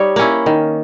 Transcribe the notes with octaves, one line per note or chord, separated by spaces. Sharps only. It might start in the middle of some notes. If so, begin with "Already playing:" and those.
Already playing: G3 D#4 C#5
A#3 C#4 E4
D#3